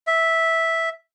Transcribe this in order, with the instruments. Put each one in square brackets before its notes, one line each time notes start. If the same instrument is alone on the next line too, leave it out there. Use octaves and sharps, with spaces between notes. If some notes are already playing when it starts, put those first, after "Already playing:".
[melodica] E5